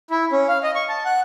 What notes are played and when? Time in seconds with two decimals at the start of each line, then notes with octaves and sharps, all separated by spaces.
0.10 E4
0.32 C#4
0.48 F5
0.63 D#5
0.75 C#6
0.89 A5
1.05 F#5